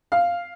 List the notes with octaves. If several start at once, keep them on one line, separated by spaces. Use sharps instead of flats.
F5